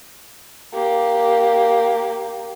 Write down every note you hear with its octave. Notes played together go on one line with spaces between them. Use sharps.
A#3 G4